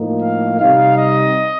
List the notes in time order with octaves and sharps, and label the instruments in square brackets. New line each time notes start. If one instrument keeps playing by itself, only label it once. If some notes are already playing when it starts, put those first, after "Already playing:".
Already playing: [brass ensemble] A2 F3 A#3 D#4
F5
C3 G3 C4 D#4 F5
D#5